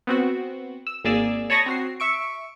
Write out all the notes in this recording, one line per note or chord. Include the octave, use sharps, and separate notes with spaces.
B3 C4 F#4
E6
G#1 A#3 G#4 D5 E6
C#5 A5 B5 C#6 D#6 A#6
C4 F#4 C7
E5 C#6 D7